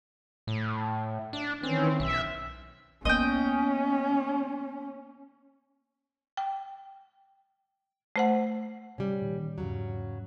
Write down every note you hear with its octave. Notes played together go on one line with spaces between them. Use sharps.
A2
D4
D#3 E3 C4 C#4
B1 E5
A#3 B3 C#4 D#5 G5
G5
A3 C5 F#5
C3 G3 C#4
A#2 D#3 E3
E2 G#2 C#3 F#3